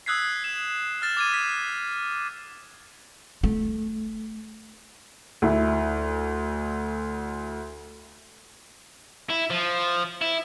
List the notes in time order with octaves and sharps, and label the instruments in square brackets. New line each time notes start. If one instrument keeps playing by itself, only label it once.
[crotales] D#6 E6 F#6 G#6 B6 C7
E7
F6 A6 E7
D6 G#6 D#7
B6
[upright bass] A3
[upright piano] D2 E4
[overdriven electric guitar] E4
F3
E4